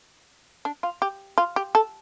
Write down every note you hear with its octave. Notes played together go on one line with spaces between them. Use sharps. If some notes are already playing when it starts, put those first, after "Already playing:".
D4
F4
G4
F4
G4
A4